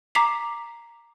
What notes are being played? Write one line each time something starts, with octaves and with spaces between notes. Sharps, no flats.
A#5 D6 B6 C7 F7